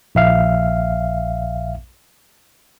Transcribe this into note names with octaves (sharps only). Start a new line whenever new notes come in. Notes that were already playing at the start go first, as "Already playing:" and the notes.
A#1 E5 F5